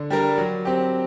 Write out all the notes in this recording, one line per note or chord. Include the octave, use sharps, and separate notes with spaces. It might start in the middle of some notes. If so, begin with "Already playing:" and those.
Already playing: D3
G3 D4 G4 A#4
F#3
C4 G4